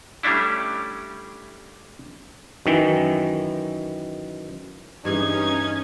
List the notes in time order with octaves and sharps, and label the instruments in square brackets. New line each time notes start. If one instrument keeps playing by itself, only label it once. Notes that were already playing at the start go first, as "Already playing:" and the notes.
[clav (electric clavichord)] G3 A3 C#4 D4 E4
F#2 D#3 E3
[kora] G2 E3 G#4 [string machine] C#4 [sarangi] D#4 [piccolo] G#6